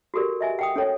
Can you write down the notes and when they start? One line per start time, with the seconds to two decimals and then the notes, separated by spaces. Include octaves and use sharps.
0.14 F#4 G4 A4 A#4 D5
0.41 D#5 E5 G#5
0.59 F#5 G5 D#6
0.76 C#4 A4 C#5